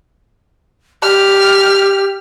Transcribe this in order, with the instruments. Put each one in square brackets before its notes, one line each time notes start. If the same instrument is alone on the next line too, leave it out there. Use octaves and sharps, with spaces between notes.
[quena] G4 [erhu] F6